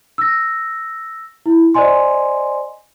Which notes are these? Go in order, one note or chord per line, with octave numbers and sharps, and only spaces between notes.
E6 A#6
E4
C5 D5 D#5 G#5 C6